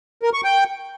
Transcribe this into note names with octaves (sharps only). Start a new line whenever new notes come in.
A#4
C#6
G5